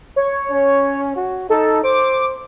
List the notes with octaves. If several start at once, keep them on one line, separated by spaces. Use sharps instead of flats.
C#5
C#4
F#4
D#4 A4
C5 D6